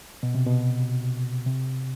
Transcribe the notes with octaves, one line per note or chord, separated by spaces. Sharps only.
B2
C3
B2
C3